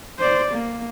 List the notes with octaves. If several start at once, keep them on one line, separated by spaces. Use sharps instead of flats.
C5 D5
A#3